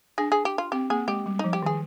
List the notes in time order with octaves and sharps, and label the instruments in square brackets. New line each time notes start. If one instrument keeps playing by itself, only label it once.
[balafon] D4 [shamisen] G#4
[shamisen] G#4
G4
F4
[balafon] C4 [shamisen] G4
[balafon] A#3 [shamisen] G#4
[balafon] G#3 [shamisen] G4
[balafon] G3
[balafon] F3 [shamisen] D#4
[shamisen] G4
[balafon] D#3 [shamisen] G#4